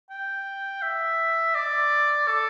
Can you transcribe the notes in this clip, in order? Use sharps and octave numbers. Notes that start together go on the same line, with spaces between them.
G5
E5
D5
A4